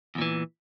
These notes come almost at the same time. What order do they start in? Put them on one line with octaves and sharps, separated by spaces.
E2 A#2 E3